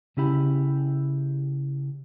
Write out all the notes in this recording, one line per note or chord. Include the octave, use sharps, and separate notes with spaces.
C#3 C#4 E4 G4 B5